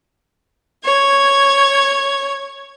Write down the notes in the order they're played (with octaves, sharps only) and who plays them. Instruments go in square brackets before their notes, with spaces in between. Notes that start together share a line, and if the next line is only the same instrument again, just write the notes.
[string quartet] C#5 G#6